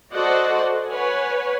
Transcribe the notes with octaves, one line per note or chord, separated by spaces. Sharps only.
F#4 A4 C5 D5 D#5 F#5
B4 C#5 F#5 G#5